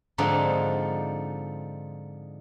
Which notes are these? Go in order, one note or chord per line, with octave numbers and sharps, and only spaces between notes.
G#2 D3 F3 C4 D#4